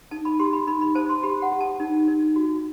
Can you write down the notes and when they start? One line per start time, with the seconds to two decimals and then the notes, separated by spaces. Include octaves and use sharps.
0.11 D#4 A5
0.25 B5
0.39 G4 C6
0.53 B5
0.67 D#4 B5
0.81 B5
0.95 C5 A5
1.09 C6
1.23 G4 B5
1.42 F#5
1.52 G4
1.60 A5
1.80 D#4
2.08 D#4
2.36 F#4